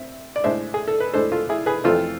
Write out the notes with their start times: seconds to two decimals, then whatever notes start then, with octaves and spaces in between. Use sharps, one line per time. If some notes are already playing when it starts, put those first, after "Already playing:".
Already playing: C4 E5
0.36 D5
0.44 A2 G#3 D4 C5 E5
0.74 G#4
0.88 A4
1.00 B4
1.14 A2 G#3 D4 A4 C5
1.32 F4 A4
1.49 E4 G#4
1.66 G#4 B4
1.84 F2 E3 A3 C4 F4 A4